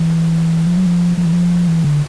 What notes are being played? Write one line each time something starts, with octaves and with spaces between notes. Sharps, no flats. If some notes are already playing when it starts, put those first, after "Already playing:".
Already playing: E3
F3
F#3
F3
F3
E3
F3
E3
D3